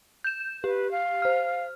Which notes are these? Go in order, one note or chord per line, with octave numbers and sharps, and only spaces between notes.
G6 E7
G4 B4
F5
C5 F6